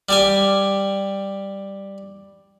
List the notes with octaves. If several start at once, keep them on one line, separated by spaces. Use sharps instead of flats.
G3 G4 G#5